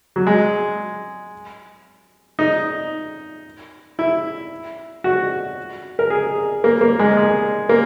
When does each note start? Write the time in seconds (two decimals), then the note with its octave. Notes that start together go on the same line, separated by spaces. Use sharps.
0.16 F#3
0.27 G#3
2.39 D#4
3.99 E4
5.04 F#4
5.99 A#4
6.10 G#4
6.64 A#3
6.81 A#3
6.99 G#3
7.17 G#3
7.69 A#3